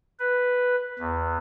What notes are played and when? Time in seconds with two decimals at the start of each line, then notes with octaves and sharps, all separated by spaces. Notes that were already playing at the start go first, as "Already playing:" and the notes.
0.19 B4
0.99 E2